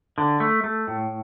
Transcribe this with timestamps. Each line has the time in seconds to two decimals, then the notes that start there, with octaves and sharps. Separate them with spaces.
0.18 D3
0.40 A3
0.64 A3
0.88 A2